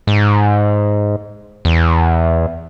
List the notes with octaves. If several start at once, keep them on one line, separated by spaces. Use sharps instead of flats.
G#2
E2